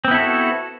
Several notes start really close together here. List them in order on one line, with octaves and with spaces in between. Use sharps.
C4 B3 E4 A4 F#4